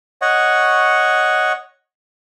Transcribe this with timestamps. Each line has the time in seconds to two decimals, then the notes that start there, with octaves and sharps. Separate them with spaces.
0.22 C#5 D#5 F#5 C#6